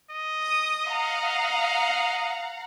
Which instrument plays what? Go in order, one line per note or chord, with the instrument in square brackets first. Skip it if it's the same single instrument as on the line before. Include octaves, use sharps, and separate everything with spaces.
[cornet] D#5
[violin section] D#6
F5 F#5 A#5